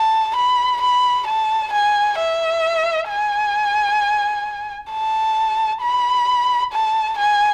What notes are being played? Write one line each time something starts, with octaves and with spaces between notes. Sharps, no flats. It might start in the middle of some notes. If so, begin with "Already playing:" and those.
Already playing: A5
B5
B5
A5
G#5
E5
G#5
A5
B5
A5
G#5